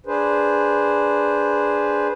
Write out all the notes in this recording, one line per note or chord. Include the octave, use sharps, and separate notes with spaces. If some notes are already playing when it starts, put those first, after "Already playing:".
D4 G#4 B4 C5